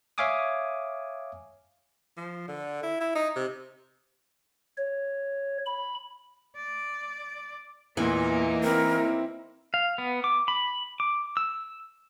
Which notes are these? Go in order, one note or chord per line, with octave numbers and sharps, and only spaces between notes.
C#5 E5 F5 G#5 D6 D#6
F3
D3
E4
E4
D#4
C3
C#5
B5
D5
E2 A#2 E3 A#3 D#4
C4 E4 A#4
F5
B3
D6
B5
D6
E6